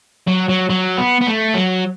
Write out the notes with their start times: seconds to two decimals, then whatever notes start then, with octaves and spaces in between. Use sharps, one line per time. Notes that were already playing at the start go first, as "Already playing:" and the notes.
0.27 F#3
0.49 F#3
0.70 F#3
0.98 B3
1.21 B3
1.27 A3
1.54 F#3